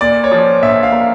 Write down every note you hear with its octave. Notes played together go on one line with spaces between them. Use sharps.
A#2 D5
C#5
F3 D5
A#1 E5
F5
A#3